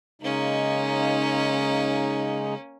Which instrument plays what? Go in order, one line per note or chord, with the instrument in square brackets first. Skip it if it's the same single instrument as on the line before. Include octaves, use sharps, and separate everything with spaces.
[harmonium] C#3 G#3 D#4 [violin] A#3 C#4